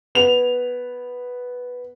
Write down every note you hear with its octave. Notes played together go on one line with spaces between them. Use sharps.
B3 F7